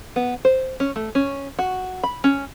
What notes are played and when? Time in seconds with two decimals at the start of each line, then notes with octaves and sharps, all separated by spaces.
0.16 B3
0.45 C5
0.80 C#4
0.96 A3
1.15 C#4
1.59 F#4
2.03 B5
2.24 C#4